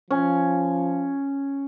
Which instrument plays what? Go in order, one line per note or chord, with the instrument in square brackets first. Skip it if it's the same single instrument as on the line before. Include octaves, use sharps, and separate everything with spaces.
[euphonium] F3 [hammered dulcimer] C#4